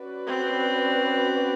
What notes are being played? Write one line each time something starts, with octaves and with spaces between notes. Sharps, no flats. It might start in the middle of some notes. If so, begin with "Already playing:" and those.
Already playing: C#4 F#4 B4 D5
C4